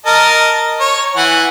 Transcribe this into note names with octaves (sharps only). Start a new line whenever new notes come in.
A#4 D#5 A5
C#5
E3 F#5 G#5